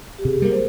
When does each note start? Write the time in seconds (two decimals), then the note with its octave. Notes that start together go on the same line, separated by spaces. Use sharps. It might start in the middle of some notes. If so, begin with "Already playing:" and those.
0.18 G4
0.24 C3 G#4
0.33 G4
0.42 G3 A#4
0.45 A#3
0.51 C5